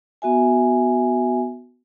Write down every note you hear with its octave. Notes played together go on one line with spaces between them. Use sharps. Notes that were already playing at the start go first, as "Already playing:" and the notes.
B3 F#4 E5 G#5